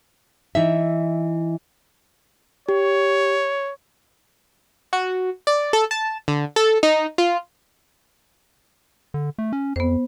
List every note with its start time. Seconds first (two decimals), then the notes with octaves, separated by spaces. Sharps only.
0.55 E3 D#4 E5
2.69 G4 C#5
4.93 F#4
5.47 D5
5.73 A4
5.91 A5
6.28 D3
6.56 A4
6.83 D#4
7.18 F4
9.14 D3
9.38 A3
9.53 C#4
9.76 F2 B3 C5